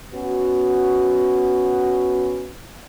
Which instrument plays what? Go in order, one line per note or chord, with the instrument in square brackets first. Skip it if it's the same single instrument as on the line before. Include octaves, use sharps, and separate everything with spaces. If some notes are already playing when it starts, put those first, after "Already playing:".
[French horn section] B3 C#4 F#4